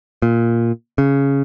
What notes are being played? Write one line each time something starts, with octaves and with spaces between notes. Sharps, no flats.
A#2
C#3